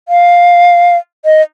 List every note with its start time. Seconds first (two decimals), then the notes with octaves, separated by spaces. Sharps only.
0.09 F5
1.25 D#5